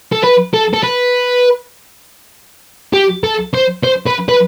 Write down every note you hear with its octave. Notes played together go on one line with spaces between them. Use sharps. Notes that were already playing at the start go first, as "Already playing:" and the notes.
A4
B4
A4
A4
B4
G4
A4
C5
C5
B4
B4